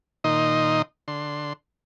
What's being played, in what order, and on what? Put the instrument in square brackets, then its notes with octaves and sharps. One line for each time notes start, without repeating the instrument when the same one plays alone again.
[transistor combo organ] A#2 D#3 D#4 D#5 C6
D3 C6